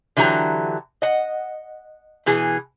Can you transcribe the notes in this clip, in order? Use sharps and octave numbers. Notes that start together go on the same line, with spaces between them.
D3 E3 F#3 G4 A#5
D#5 F#5
B2 E3 G#4 G#5